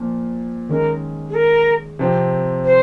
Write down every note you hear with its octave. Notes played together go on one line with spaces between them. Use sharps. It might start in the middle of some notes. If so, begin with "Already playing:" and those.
Already playing: A#2 F3 A#3
D#3 G#3 C#4 A#4
G#4
A#4
C3 F3 C4 G4
C5